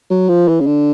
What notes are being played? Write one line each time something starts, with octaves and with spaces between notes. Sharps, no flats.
F#3
F3
E3
C#3
D3